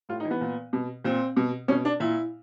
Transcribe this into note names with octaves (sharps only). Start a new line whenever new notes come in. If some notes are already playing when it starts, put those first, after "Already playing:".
A2 F4
D#4
E3
B3
A#2
B2
A#2 C4
B2
B2 C#4
D4
A#2 E4